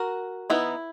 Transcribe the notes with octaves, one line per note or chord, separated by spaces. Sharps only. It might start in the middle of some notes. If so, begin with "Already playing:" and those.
Already playing: F#4 A#4
E3 B3 D#4 E4